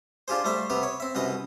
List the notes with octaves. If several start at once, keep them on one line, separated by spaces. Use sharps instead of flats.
D4 F4 G4 G#4 C5
G3 A3 C5 E5
C3 B3 G4 B4
C#5
C4 E5
C2 F#2 B4 D#5